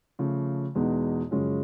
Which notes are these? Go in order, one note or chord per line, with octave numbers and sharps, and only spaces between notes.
C#3 F3 A3
E2 B2 G#3 B3 D#4
F#2 C#3 F3 G#3 C#4